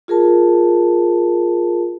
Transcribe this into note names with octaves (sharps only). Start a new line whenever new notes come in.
F4 G#4 A#4 A5